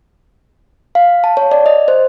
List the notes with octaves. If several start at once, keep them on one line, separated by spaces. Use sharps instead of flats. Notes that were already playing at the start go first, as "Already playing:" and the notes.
F5
A5
C#5
D5
D#5
C5